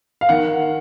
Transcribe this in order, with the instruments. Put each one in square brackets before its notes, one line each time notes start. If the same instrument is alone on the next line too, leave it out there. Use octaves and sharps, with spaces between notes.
[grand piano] F5
D#3 F#5